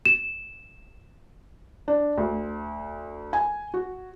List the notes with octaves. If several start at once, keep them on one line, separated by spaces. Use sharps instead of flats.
E7
D4
D2
G#5
F#4